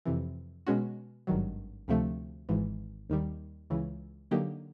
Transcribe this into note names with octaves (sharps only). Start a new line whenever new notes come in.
F2 C3 E3
B2 G#3 C#4 F#4
G#1 G2 D#3 F#3
D2 C3 F3 A3
G#1 G#2 E3
D#2 D#3 G3
C#2 C#3 E3
D3 F#3 A#3 D#4 G4